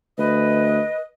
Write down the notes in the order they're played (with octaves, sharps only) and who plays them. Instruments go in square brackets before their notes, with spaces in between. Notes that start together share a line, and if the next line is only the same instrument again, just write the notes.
[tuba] D2 [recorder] B4 [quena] D#5